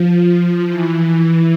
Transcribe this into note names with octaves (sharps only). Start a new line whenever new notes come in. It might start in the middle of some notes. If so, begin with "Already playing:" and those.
Already playing: F3
E3